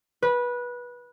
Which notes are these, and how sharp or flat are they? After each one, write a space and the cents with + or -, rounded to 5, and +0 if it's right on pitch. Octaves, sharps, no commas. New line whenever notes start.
B4 -20